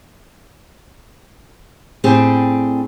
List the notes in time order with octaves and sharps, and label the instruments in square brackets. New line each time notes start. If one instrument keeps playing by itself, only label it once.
[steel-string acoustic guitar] A2 C4 D4 G4 G#4